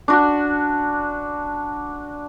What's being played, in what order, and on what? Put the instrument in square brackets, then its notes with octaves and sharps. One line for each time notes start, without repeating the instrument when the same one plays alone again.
[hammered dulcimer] D4 F#4